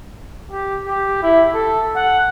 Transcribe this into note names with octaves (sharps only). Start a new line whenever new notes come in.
G4
G4
E4
A4
F#5